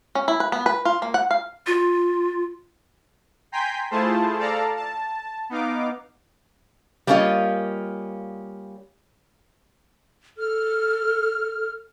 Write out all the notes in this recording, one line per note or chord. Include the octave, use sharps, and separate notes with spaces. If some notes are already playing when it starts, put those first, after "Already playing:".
C#4
E4
B4
B3
B4
F4
A#3
F#5
F5
F4
G5 G#5 A#5 C6 G6 B6
A3 E4 F4 G#4 C5 A5
A4 D5 F5 A5 A#5
A5
B3 D#4 F5 D6
G3 A#3 C#4 D#4 F4 D#5
A4 F6